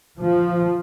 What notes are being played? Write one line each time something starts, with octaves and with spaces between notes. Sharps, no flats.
F3